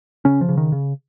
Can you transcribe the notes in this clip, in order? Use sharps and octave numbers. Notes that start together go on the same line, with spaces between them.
C#3 C#4
F3
C#3
D#3
C#3